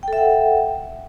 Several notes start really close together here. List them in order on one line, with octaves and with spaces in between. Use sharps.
G5 A4 E5 F#5